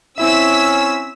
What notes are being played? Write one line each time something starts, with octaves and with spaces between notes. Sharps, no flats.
C4 C#4 E4 E5 E6 B6